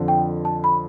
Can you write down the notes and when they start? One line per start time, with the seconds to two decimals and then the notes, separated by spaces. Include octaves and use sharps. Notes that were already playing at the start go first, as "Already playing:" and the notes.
Already playing: F2 D3 F3
0.08 G5
0.45 A5
0.64 B5